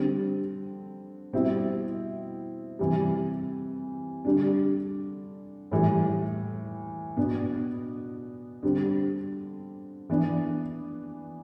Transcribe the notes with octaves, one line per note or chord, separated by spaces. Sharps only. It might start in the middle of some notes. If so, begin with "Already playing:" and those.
Already playing: D3 G3 C4
B2 G3 C4 E4
C3 E3 G3
D3 G3 D4
A2 E3 G3
B2 B3 D4
D3 G3 C4
E3 B3 D4